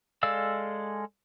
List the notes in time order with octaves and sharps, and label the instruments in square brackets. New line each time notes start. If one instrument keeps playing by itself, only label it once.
[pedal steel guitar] G#3 A4 D5 F5 E6